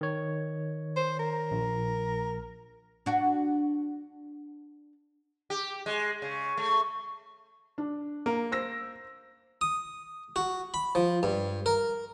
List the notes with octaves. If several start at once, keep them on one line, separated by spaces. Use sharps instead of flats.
D#3 C#5
C5
A#4
A#1
D4 F#4
G4
G#3
C#3
A3
D4
A#3
C5 E6 A#6
D#6
F#4
B5
F3
G2
A#4